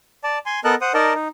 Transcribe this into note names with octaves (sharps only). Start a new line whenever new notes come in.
D5 A5
G#5 C6
B3 A4 A#4 D#5 A5 F#6
C5 F#5 D#6
D#4 A#4 D5 D#5 A5
D#4